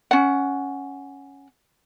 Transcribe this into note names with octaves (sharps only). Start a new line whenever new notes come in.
C#4 F#5